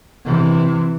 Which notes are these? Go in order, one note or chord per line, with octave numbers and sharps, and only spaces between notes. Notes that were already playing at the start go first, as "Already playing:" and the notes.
C3 E3